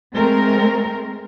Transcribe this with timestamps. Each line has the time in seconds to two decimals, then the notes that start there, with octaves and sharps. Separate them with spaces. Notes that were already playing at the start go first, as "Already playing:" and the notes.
0.13 G#3 A3 C4 A#4